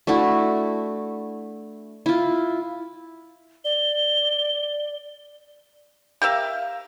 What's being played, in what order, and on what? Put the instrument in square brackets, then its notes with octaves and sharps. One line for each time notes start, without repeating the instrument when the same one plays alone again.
[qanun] A3 D4 E4 F#4
E4 F4
[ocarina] D5 [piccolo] G7
[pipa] G4 A#4 E5 F5